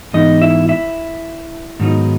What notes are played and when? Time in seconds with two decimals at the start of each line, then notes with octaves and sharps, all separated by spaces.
0.13 G#2 E3 B3 D#4 D#5
0.42 E4 E5
0.69 E4 E5
1.80 G#2 D#3 F#3 B3 D#4